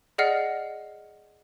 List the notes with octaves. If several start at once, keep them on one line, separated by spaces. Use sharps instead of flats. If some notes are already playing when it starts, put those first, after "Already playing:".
G#4 D5 D#5 F#5 F6 C7